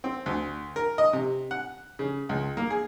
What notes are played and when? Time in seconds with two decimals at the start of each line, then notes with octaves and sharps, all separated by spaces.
0.04 C4
0.26 D2
0.76 A#4
0.98 D#5
1.13 C3
1.51 F#5
1.99 C#3
2.29 C#2
2.57 A#3
2.70 G#4